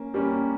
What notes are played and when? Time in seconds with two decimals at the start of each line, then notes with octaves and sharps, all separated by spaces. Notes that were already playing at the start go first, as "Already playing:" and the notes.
Already playing: A#3 C#4
0.14 G3 A#3 C#4